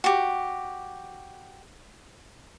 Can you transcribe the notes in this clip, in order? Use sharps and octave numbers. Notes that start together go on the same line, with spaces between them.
F#4 G4